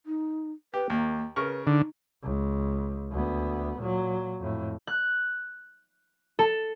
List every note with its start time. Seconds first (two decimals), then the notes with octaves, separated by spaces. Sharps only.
0.06 D#4
0.74 G4 B4
0.90 D#2 A#3
1.36 C#3 A#4 B4 C#6
1.67 D3 D#4
2.23 C#2
3.11 D2 B3
3.79 A#2 F#3
4.40 F2 A2
4.87 F#6
6.39 A4